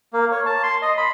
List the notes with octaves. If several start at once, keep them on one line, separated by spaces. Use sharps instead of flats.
A#3
C#5
A5
C6
D#5
B5